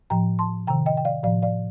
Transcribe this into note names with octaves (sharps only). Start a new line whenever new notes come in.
A2 F3 G5 A#5
A5 C6
C3 D#3 G5 A#5
D#5 G5
G5
D5 F5
A2 F3 D5 F5
D5 F5